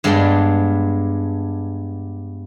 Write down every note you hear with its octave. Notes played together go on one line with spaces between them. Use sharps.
G2 G#3 B3 D4 D5 G5